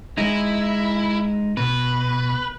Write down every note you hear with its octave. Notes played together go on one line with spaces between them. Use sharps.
G#3 D#4 E4
B2 B4